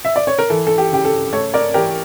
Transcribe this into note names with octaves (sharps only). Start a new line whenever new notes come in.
E5
D5
C#5
A#4
E3 A4
A4
G4
C#3 G4
A4
A3 A4 C#5
A#4 D5
E3 G4 A#4